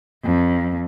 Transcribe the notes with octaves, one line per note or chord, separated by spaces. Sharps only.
F2